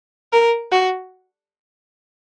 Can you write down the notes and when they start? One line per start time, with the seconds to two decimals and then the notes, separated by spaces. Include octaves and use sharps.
0.32 A#4
0.72 F#4